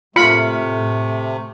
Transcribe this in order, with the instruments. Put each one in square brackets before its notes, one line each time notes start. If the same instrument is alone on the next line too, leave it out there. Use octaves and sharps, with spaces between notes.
[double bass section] A2 [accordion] C3 A3 [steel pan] F4 B5 [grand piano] F6 C#7